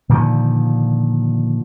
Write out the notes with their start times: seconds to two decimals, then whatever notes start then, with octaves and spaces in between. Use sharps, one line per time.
0.09 A#2 D3 D#3 F3